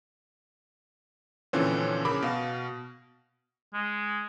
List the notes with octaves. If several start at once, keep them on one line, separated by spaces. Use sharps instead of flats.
A#2 D3 E3 F3 C4 C#4
C#3 A#4 B5 D6
B2 F5
G#3